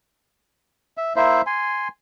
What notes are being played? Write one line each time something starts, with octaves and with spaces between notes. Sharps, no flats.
E5
A#3 E4 C5 E5
G#5 C6